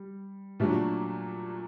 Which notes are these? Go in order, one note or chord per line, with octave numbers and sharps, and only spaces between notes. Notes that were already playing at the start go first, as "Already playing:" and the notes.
Already playing: G3
A#2 F#3 A3 D4 F#4